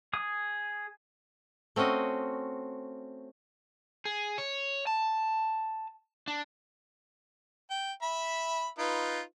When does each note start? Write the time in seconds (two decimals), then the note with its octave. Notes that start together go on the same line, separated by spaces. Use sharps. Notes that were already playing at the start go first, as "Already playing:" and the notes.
0.13 G#4 D#6
1.76 A3 C4 C#4 F#4 D#5
4.05 G#4
4.38 C#5
4.87 A5
6.28 D4
7.70 G5
8.02 E5 B5
8.79 D#4 F4 B4